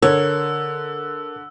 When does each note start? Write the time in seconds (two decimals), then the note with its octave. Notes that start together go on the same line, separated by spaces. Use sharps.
0.02 D3 A#4 C#5 E6